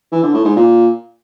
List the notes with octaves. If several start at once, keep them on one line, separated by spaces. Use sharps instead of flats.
E3
D3
A2
G#2
A#2